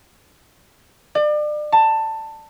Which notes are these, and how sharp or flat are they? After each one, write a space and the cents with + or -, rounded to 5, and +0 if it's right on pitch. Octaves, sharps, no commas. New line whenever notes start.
D5 +35
A5 +15